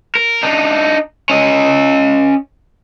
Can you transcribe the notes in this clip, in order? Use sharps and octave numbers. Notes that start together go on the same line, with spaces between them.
A#4
D4 D#4
C#4 D#5